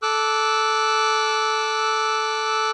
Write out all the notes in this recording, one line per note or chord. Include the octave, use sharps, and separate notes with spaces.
A4 D6 E6 F#6